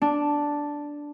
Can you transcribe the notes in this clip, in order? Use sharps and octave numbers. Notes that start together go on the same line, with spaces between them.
D4